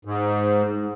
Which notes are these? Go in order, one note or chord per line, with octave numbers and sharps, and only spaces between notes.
G#2